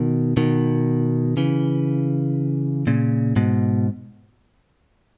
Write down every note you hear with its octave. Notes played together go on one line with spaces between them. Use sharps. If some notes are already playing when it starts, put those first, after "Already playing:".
Already playing: B2 D#3
B2 D#3
C#3 E3
A#2 C#3
G#2 B2